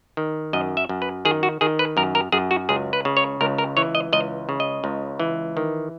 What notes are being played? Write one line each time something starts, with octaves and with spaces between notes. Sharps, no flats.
D#3
F#2 D#5
E5
F#2
B4
D#3 G#4
F#4
D#3 G#4
B4
F#2 A#4
A#4
F#2 G#4
F#4
C#2 G#4
B4
C#3
C#5
C#2 A#4
A#4
E3 C#5
D#5
C#2 D#5
C#3
D#5
C#2
E3
D#3